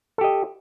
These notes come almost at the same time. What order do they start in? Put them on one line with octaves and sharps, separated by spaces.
A4 G4 D#5